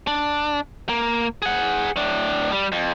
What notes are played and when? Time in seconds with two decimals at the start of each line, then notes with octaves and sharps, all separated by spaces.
0.07 D4
0.89 A#3
1.42 G#4 F#5
1.96 A2 D4
2.52 G3
2.72 F2